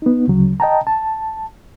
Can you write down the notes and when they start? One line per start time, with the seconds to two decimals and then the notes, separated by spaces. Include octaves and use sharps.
0.02 B3 D#4
0.28 D2 C#3 F#3
0.60 D#5 G5 A5 A#5
0.87 A5